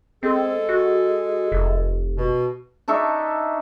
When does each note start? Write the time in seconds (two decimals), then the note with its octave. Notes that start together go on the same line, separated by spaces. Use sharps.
0.23 G#3 C4 G#4 A4
0.69 F#4
1.52 F1
2.16 B2
2.88 D4 D#4 E5 C#6